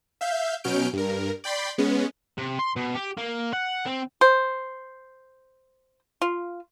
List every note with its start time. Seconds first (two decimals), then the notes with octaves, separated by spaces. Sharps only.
0.21 E5 F5 G6
0.64 B2 F#3 C#4 F6 G6 D7
0.93 G2 A#4
1.44 D5 G5 B5 C6
1.78 G#3 B3 C#4
2.38 C3
2.59 C6
2.76 B2
2.95 G4
3.17 A#3
3.53 F#5
3.86 C4
4.21 C5
6.22 F4